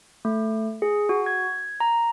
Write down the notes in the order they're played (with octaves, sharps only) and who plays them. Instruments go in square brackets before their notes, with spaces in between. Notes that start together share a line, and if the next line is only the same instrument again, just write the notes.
[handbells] A3
G#4
F#4
G#6
A#5